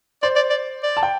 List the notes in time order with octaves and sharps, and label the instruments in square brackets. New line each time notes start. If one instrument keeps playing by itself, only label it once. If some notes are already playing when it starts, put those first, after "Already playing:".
[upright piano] C5 [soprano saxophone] D5
[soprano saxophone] D5
D5
D5
[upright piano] A5
G5